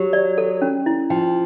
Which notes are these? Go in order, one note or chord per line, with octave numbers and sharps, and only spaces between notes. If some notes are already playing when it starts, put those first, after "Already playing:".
Already playing: F#3 G4
D5
A4
C#4
E4
F3 G5